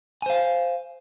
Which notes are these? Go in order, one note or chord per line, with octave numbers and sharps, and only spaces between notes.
C5 F5 G#5